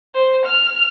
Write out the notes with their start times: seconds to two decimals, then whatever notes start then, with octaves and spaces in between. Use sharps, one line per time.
0.14 C5
0.45 F6 F7